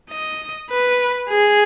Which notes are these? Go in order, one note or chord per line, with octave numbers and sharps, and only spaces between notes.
D#5
B4
G#4